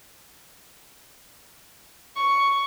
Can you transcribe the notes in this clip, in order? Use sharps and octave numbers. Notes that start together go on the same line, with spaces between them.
C#6